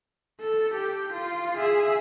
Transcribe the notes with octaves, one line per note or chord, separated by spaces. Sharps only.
A4
G4
F4
G#4 E5